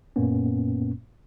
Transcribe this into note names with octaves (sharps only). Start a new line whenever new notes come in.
F#2 A#2 A#3 B3 C#4